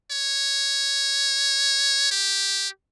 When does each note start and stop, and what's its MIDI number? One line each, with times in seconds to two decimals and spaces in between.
0.11 2.10 73
2.11 2.69 67